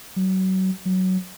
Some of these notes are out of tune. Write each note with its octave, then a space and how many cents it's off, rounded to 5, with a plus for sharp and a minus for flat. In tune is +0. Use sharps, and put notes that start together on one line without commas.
F#3 +30
F#3 +10